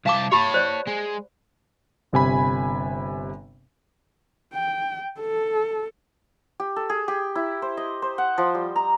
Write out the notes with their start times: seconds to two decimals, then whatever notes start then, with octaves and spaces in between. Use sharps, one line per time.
0.06 C2 F5 A5 D6
0.32 G4 C#5 A5 B5
0.54 C5 D5
0.88 G#3
2.13 G1 C3 G#5 B5
4.54 G5
5.20 A4
6.60 G4
6.76 A4
6.90 G#4
7.08 G4
7.35 E4
7.62 C5
7.77 D#5
8.02 C5
8.18 F#5
8.38 F3
8.55 G3
8.76 A#5